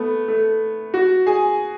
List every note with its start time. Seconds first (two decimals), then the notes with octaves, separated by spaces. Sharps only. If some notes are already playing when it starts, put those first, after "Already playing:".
Already playing: A3 B3
0.28 A3
0.94 F#4
1.27 G#4